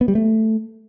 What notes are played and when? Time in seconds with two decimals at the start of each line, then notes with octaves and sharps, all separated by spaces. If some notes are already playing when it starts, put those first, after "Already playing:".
0.01 B3
0.08 G3
0.15 A3